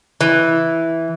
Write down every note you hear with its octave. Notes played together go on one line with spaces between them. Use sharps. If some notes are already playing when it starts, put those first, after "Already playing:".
E3